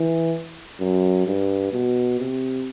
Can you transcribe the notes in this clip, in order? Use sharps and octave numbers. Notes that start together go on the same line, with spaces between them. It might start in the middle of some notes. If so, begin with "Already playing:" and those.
Already playing: E3
F#2
G2
B2
C3